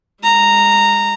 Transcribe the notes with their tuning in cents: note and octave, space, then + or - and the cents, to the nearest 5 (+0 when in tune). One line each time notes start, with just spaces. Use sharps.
G#3 -40 A#5 -10